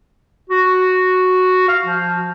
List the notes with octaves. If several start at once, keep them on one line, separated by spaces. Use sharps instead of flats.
F#4
F5
F3